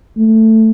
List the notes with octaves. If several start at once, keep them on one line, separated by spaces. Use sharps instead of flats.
A3